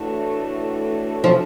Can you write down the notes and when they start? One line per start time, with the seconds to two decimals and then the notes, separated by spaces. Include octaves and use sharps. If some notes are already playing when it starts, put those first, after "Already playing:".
Already playing: A2 E3 A3 D4 F#4
1.24 F3